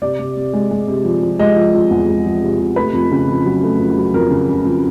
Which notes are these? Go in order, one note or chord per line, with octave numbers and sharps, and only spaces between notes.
C3 D5
C3
C3
G#3
G#3
C3
F3
F3
G#3 D#5
F3
F3
E2
G#3
F3
C3
C3
A3 B4
F2
C#3
F2
F#3
A3
F2
F#3
F2 A#4
C#3
C#3
F2